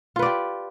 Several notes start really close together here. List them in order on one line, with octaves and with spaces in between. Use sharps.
F4 B4 D5 G4